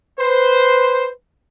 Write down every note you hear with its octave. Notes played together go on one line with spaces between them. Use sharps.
B4 C5